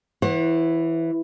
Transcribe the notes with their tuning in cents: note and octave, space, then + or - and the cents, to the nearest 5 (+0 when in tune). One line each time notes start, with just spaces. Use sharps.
E3 +0 C5 +45 F#5 +0